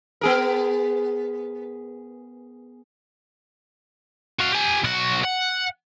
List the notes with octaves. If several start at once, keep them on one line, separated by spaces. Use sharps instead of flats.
B3 G#4 A#4
F#4 F5
G4 G#5
B1 F#4
F#5